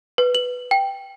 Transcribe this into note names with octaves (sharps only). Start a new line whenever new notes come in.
B4
F#7
G5